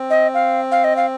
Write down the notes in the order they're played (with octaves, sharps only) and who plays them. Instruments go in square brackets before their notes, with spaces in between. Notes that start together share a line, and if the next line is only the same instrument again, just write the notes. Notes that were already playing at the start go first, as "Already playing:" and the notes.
Already playing: [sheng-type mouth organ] C4
[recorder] D#5
F5
F5
D#5
F5